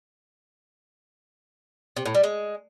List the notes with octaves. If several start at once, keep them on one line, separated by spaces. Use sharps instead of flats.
C3
A2
G3
G#3